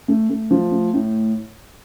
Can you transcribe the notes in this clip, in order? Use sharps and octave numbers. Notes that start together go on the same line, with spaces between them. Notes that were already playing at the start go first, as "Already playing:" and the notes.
A3
A3
F3
A3
A2